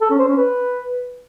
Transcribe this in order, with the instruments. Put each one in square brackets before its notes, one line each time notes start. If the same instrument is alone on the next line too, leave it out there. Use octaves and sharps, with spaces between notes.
[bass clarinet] A4
C#4
C5
C#4
B4